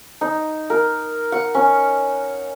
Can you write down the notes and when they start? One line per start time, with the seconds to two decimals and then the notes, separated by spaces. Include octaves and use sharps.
0.21 D#4
0.70 A#4
1.32 F#5
1.55 C#4